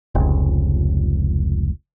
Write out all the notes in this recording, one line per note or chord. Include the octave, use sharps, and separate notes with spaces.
F1 C#2